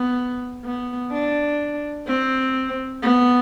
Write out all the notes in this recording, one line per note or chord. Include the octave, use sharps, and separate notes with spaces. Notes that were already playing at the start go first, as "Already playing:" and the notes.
Already playing: B3
B3
D4
C4
B3